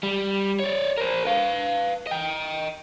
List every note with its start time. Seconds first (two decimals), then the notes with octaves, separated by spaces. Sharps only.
0.03 G3
0.60 C#5 D5
0.98 A#4 C5
1.25 B4 F5
2.07 D#5 G5